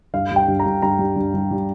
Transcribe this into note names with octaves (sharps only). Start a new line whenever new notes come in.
G2 F5
G3 G5
G2
A#5
G2
G2 A#5
G3
G2
G2
G3